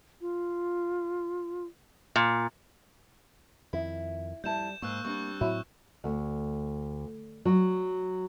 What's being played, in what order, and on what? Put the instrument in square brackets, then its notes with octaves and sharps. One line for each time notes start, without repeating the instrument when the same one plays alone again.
[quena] F4
[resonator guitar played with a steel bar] A#2
[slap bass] F2 D#3 [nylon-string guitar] E4
[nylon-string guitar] F2 E4 A5 [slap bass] G3 [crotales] G6 E7
[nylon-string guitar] G#2 [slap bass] A#3 [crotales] C#6 E6 F#6
[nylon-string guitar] G3 C4 D4 [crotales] C#6
[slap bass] A2 C4 [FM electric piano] F#3 E4
[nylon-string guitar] D2
F#3